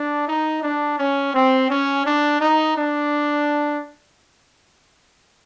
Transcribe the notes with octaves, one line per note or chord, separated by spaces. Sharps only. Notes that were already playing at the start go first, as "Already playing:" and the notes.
Already playing: D4
D#4
D4
C#4
C4
C#4
D4
D#4
D4